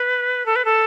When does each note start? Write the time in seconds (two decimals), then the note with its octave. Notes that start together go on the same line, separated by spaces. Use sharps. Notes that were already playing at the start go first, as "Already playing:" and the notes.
Already playing: B4
0.46 A4
0.56 B4
0.65 A4